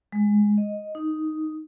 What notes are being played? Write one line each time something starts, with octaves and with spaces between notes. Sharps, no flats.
G#3
D#5
D#4